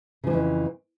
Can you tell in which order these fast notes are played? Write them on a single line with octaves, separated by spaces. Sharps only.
C#3 F3 E3 F2